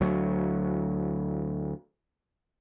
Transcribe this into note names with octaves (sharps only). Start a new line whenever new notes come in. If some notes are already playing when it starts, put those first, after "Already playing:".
D2 F#3